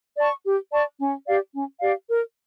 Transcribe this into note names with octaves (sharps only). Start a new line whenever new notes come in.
D5 A5 C#6
G4
D5 A5 C#6
C#4
G4 D5 F5
C#4
G4 D5 F5
A#4